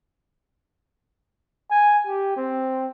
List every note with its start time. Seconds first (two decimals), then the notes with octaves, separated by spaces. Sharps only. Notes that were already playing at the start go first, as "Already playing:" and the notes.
1.71 G#5
2.07 G4
2.37 C4